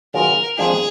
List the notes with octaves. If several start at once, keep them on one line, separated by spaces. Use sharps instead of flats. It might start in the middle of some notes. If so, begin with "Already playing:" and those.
D#3 F#3 B3 F4 G#4 A#4
F2 F3 G#3 D4 F4 G#4